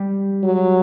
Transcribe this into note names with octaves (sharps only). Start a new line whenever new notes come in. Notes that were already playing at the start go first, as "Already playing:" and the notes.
Already playing: G3
F#3